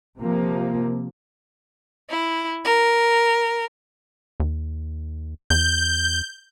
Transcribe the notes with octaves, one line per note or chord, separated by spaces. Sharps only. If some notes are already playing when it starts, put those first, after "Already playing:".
C3 F3 A#3
E4
A#4
D#2
E2 G6